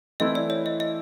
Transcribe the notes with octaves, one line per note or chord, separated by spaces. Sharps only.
E3 A3 C4 E4 D#5
D5
C#5
D#5
D#5